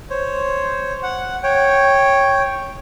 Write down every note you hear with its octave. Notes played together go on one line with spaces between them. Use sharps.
C5 C#5
F#5
C#5 G5